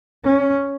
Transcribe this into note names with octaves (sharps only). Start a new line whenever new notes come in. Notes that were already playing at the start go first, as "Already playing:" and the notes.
C#4